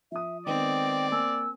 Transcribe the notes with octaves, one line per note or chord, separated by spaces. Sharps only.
F3 E5 D#6
D#3 G#3 B3 C4 D5 G5
A#3 G#5 E6